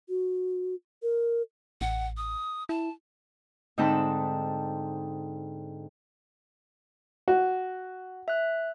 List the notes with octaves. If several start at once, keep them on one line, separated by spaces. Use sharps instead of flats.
F#4
A#4
A1 F#5
D#6
E4 A5
G#2 D3 C4 D#4 A5 B5
F#4
E5 F#6